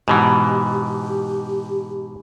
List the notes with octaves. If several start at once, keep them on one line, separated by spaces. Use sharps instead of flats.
G#2 B2 E3 G4